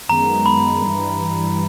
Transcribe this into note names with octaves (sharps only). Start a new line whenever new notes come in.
F#2 D#3 G#3 B3 A#5
B5
G2 E3 G3